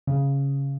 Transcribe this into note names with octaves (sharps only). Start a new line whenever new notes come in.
C#3